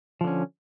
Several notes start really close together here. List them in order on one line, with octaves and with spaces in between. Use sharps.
F3 D3 C#4